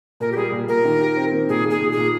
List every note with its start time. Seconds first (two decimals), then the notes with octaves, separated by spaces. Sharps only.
0.20 A#2 A#4
0.32 G4
0.36 G3 G#4
0.52 A#2
0.68 A#2 A#4
0.85 D#3
1.01 G4
1.17 C4
1.32 D#3
1.49 A#2 G#4
1.65 A#2
1.71 G#4
1.81 A#2
1.92 A#2 G#4